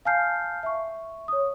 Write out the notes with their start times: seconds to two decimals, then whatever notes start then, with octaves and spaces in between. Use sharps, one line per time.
0.05 F5 G#5 A5 F6 G6 C7
0.63 E5 C#6
1.28 C#5 D#6